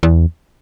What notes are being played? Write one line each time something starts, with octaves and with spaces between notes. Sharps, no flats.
E2